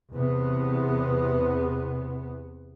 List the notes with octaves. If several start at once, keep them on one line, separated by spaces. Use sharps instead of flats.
E2 C3 B3